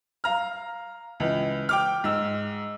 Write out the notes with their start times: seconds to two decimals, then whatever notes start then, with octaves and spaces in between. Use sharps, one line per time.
0.24 F5 A#5 F6
1.20 C#2 E3
1.69 G5 D6 F6
2.04 G#2 E6